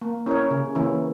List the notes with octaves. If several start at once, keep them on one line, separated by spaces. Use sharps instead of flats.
A#3
C#4 E4 A#4 C#5
C#3
E3 A#3 C#4 E4